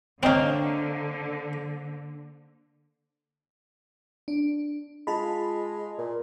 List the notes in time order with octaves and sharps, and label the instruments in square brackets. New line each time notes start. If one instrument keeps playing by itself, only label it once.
[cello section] D3 [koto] A#3 C5 [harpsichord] C4 C#4 [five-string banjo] C#5 D#5 G5
[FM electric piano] D4
[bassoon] G#3 [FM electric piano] F4 A5 B5
[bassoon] A#2